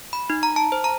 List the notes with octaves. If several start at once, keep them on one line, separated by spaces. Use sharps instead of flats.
B5
D#4
A#5
A5
C5
A#5